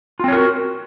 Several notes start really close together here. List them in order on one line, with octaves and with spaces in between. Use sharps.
F4 C4 C#5 A#4 F#4